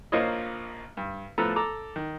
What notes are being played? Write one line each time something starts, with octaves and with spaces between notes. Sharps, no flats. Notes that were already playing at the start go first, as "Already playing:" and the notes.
A#1 A#3 F4 C5 C#5 D#5
G2
A2 F3 B3 A4 A#5
A4 A#5 D6
D#3